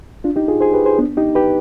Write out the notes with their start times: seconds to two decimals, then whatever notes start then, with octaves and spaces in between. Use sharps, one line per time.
0.24 D4 F4
0.36 D#4 G4
0.48 F4 G#4
0.61 G#4 C5
0.73 G4 B4
0.86 G#4 C5
0.99 B3 D4
1.17 D#4 G4
1.35 G4 B4